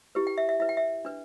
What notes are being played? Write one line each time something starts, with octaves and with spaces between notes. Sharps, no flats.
E4 G4 B4
G5
E5
E5
E4 B4 E5
G5
E5
D4 B4